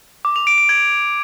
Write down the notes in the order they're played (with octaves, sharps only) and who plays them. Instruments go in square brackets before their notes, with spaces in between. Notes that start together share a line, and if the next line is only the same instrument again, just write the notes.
[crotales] D6
F7
D7
D7
G#6